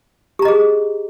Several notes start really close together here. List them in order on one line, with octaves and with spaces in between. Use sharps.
G4 A#5 D#5 G#4